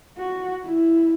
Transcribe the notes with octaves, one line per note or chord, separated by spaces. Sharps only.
F#4
E4